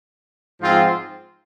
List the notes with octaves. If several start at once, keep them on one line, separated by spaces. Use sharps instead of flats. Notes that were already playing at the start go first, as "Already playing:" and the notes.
G#2 F3 C4 F4